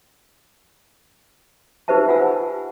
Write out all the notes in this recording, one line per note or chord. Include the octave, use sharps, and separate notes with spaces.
D#4 G4 B4 C5 E5 A5
F4 F#5 G#5 E6